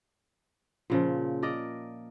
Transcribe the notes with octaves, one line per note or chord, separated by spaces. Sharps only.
A#2 C#3 F3
A#4 D5 D#5